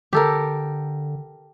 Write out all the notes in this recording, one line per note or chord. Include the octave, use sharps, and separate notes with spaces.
D3 G4 A4 A#4